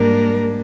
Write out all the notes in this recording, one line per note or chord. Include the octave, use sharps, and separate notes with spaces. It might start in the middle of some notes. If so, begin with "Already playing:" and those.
Already playing: G#2 G3 A#3 D4 A#4